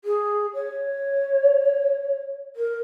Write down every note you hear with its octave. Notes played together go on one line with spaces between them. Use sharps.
G#4
C#5
A#4